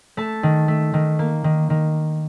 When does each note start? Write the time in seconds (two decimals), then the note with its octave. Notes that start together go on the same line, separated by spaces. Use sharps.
0.17 A3 A5
0.43 D#3
0.68 A3
0.94 D#3
1.19 A#3
1.44 D#3
1.70 D#3